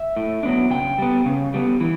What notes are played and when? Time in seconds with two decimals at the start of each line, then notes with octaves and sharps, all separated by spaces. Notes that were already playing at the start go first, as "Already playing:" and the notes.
Already playing: E5
0.16 A2
0.43 F#3 B3 D4
0.71 C#3 G5
0.98 G3 B3
1.26 C#3
1.54 G3 B3
1.81 E3